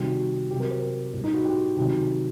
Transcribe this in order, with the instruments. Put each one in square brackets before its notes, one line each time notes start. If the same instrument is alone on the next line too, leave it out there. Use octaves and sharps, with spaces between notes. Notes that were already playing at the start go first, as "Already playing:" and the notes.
Already playing: [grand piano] C3 D#3 G3 F#4
C3 F#3 G4
A#4
C5
A#4
A2 G3
D#4
F#4
G4
C3 D#3 F#3